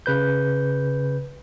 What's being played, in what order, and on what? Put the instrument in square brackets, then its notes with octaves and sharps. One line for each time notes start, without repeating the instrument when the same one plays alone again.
[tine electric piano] C#3 B4 G6